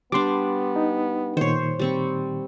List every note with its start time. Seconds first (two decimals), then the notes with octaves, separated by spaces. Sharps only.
0.12 G3 B3 D4 C6 D6
0.76 D#4
1.37 A#2 D#3 C5 C#5
1.79 G3 C4 C#6